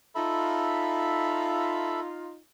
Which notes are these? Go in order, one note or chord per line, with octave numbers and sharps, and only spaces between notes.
D#4 F4 A4 E5 B5